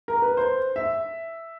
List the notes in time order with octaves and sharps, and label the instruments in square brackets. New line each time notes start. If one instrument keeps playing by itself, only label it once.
[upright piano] A#4
B4
C5
E5